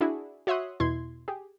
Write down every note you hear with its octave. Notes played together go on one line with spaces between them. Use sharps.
D4 E4 F#4 G#4
F#4 C#5 E5 C6 D#6 F#6
E2 B2 E4 C6 G#6
G4 G#4